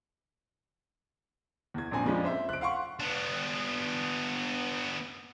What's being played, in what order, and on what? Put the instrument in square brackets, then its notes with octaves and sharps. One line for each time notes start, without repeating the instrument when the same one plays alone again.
[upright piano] E2 G#6
A#1 F#2 C4 G#5
F2 F3 G#3 C#4 D4
C5 E5
F#6 D7
F5 F#5 C6 C#6
[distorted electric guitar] B3 D4